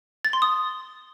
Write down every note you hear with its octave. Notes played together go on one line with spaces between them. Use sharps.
A6
C6
D#6